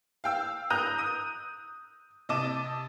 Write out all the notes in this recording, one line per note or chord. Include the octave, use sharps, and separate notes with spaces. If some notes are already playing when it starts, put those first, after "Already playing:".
F5 G5 E6
A#5 D#6 F#6 G6 D#7
D#6 D#7
C3 D#5 A5 D6 D#7 E7